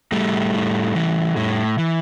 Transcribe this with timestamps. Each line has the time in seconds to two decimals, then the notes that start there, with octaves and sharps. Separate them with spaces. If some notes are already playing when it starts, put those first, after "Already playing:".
0.12 A2 G3 A3
0.54 A2
0.95 E3
1.37 A2
1.78 E3